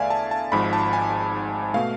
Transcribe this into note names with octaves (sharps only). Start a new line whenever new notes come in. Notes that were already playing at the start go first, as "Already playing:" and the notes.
Already playing: E2 D3 A3 D5 E5 F5 G#5
A5
A5
G#1 G#2 F3 B5
A5
G#5
B2 A3 F5